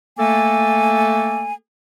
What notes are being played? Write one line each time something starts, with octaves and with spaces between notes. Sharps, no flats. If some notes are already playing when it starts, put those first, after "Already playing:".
A3 A#3 A4 G#5